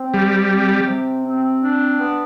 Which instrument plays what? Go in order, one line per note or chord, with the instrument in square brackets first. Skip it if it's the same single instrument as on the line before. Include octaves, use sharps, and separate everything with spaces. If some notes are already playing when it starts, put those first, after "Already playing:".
Already playing: [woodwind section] C4
[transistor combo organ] G3 [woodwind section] G4
[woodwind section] C4
C3
C4
D4
B3